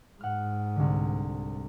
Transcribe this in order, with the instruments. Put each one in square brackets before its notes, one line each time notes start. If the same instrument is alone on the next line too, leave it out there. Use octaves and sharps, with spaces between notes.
[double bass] G#2 [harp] F#5 F6
[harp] C2 D3